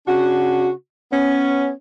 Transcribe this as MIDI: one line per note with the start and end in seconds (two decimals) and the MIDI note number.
0.06 0.70 49
0.06 0.70 62
0.06 0.70 66
1.12 1.71 59
1.12 1.71 61